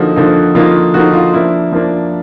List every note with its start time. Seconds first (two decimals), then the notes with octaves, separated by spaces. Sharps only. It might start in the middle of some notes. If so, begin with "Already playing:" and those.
Already playing: D3 F3 A#3 D#4 F#4
0.16 D3 F3 A#3 D#4
0.55 D3 F3 A#3 D#4 F4
0.94 D3 F3 A#3 D#4 F#4
1.14 F4
1.33 F3 A#3 D4 E4
1.73 F3 A#3 D4